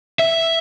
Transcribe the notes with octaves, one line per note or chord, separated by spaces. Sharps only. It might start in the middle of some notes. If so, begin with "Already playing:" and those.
E5